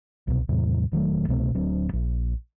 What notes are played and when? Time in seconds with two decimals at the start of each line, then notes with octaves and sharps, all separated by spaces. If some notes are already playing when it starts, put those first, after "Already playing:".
0.28 C2 B2
0.49 E2 A2 C3 F#3
0.92 E1 D#3 F#3 A3
1.28 C2 B2 A3 C4
1.54 D1 F#3 C4 D4
1.93 A#1